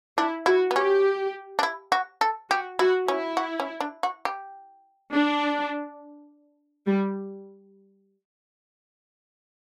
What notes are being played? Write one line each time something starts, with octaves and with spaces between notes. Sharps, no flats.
D4 E4
E4 F#4
B3
C#4 G4
D4
E4
F#4
A4
F#4 G4
E4 F#4
C#4 E4
F#4
C#4
D4
F#4
G4
D4
G3